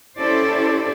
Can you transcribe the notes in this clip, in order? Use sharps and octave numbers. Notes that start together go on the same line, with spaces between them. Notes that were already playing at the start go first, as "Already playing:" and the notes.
C#4 E4 G4 A4 C5 D5